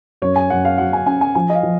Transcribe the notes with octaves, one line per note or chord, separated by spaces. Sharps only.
F#2 C#5
G#5
F#2 F#5
F5
F#3 F#5
G#5
C#4 G#5
G#5
F3 G#5
D#5
F5
F3